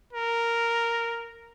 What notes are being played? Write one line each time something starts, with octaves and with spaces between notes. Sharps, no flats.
A#4